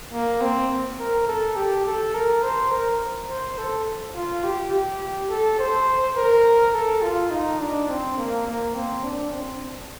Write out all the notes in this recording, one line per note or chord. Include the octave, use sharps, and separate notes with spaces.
A#3
C4
A#4
A4
G4
A4
A#4
C5
A#4
C5
A4
F4
G4
G4
A4
C5
A#4
A4
F4
D#4
D4
C4
A#3
A#3
C4
D4
C4